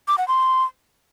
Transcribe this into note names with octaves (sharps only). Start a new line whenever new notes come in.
D6
F#5
C6